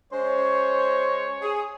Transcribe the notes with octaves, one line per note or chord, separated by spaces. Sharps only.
G#3 C#4 C5 C#5
G#4